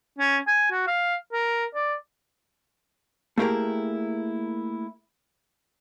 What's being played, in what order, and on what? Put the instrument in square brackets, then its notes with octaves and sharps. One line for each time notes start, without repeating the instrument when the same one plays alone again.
[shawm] C#4
G#5
F#4
F5
A#4
D5
[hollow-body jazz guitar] A3 A#3 E4 G4 G#4 A#4